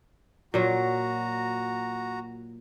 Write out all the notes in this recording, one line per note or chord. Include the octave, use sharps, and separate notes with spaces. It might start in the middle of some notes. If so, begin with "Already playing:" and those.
A#2 F#3 F#4 A#5